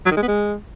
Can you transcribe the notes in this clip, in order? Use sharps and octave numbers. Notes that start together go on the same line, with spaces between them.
F#3
D#3
G#3
B3
G#3